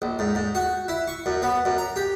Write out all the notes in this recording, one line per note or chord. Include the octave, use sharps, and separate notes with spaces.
A#1
G#2
G#2
F#4
E4
C#6
F#2
B3
F#2
A#5
G4